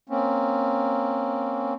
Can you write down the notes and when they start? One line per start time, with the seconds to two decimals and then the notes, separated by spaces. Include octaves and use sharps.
0.09 A#3 C4 C#4